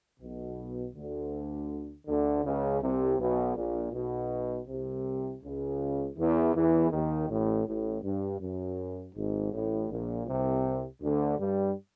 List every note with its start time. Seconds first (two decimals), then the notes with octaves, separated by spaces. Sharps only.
0.20 B1 B2
0.95 D2 D3
2.07 D2 D3
2.45 C#2 C#3
2.81 C2 C3
3.19 B1 B2
3.56 A#1 A#2
3.93 B1 B2
4.68 C2 C3
5.42 C#2 C#3
6.17 E2 E3
6.55 E2 E3
6.91 D#2 D#3
7.29 A1 A2
7.66 A1 A2
8.03 G2
8.41 F#2
9.16 G#1 G#2
9.52 A1 A2
9.90 A#1 A#2
10.27 C2 C3
11.01 D2 D3
11.39 G2 G3